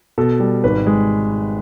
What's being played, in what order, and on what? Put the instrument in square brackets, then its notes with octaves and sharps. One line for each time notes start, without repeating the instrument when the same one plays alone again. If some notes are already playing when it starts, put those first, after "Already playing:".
[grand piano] B2 A4
G3
G#1 B4
G#3